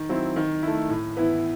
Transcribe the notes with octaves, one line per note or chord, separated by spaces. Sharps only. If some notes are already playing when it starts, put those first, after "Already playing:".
Already playing: D#3
F#3 C4 E4
D#3
A3 E4
A2
E3 B3 E4